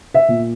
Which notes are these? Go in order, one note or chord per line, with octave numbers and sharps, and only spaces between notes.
E5
A#2